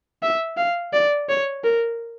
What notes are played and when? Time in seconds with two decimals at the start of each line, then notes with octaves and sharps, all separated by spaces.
0.23 E5
0.58 F5
0.94 D5
1.29 C#5
1.64 A#4